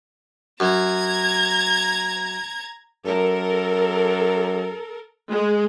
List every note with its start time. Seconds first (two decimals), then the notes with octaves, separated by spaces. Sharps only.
0.60 F#2 A#5 G#6
3.06 F#2 A4 A#4
5.31 G#3